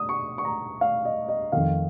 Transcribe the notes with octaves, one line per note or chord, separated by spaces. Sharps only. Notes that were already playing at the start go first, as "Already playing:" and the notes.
Already playing: D#6
C#6
C#6
A#5
F5
D#5
D#5
F2 D#3 F5